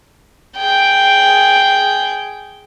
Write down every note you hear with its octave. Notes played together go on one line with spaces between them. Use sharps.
G#4 G5